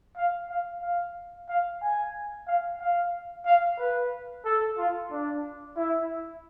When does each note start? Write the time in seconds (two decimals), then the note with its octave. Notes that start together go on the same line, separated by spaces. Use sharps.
0.16 F5
0.49 F5
0.82 F5
1.48 F5
1.81 G#5
2.47 F5
2.81 F5
3.46 F5
3.78 B4
4.45 A4
4.78 F4
5.11 D4
5.76 E4